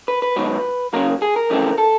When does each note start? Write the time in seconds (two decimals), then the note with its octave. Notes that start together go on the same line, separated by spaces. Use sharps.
0.08 B4
0.22 B4
0.36 G#2 D#3 F#3 B3
0.93 C#3 F#3 A#3 A#4
1.22 G#4
1.36 A#4
1.50 F2 C#3 E3 A3 C4
1.78 A4